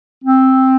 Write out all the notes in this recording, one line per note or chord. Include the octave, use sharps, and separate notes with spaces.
C4